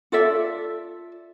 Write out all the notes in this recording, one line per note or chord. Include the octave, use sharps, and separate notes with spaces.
F4 A4 D5 E5